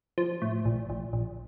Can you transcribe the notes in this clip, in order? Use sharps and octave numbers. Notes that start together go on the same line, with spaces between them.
F3
A2
A#1
A#1
A#1